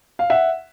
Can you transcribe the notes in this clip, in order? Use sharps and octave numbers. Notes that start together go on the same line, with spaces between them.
F5
E5 F#5